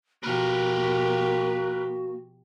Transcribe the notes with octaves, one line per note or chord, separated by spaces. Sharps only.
B2 F3 A#3 F#4 G4 A#4 B4